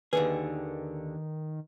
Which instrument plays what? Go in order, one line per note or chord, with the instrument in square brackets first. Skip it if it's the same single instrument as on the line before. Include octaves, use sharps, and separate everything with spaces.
[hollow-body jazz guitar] D#2 D3 G#4 [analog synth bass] D#3 [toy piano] B4